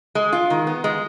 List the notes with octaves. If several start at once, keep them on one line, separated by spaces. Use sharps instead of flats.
G#3
F4
D#3
B3
G#3